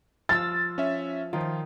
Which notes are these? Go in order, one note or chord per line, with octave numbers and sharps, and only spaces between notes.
F3 F4 E6 A6
C#4 E5
D#3 F3 F4